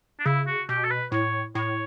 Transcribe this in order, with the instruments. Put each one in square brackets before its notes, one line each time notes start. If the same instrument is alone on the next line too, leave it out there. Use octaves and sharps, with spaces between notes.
[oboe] D4
[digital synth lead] C#3 [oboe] E4
[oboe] F#4
[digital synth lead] B2 [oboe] G4
[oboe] A4
B4
[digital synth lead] A2 [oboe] C#5
[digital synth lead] A2 [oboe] C#5